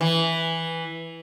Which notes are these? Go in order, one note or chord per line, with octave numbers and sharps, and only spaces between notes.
E3